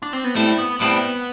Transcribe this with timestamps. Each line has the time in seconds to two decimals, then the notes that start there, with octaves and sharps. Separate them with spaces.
0.03 D4
0.13 C4
0.24 B3
0.34 A2 G3 A3 C4 E4
0.58 B3
0.80 A2 G3 B3 C4 E4